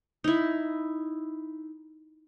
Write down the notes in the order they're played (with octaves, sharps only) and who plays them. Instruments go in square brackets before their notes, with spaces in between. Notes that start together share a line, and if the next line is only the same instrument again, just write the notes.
[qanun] D#4 E4